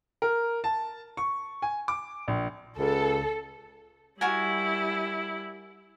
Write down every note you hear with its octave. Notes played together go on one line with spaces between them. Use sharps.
A#4
A5
C#6
G#5
D6
A#1
C#2 A4
G3 E4 F#4 A#4 G#5